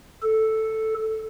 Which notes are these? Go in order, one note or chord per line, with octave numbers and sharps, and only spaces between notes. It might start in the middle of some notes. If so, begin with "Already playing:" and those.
A4